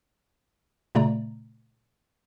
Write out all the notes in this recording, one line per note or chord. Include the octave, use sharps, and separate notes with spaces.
A#2 C#3 A3 D5 A#5